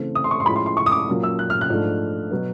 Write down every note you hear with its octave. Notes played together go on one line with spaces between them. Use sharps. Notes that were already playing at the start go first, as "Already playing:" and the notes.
Already playing: C#3 E3 A3 C4
D#6
C6
C#6
C6
A2 F3 G#3 C#4 B5
C6
C6
C#6
D#6
D6
A#2 F#3 A#3 C#4
E6
F#6
F6
F#6
G#2 F3 A3 D4
B2 F#3 B3